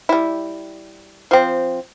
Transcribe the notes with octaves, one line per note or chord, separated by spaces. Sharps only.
G3 E4
F3 C4